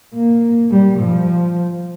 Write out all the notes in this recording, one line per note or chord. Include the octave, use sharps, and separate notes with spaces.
A#3
G3
F3